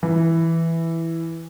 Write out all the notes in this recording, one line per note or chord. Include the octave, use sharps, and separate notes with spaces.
E3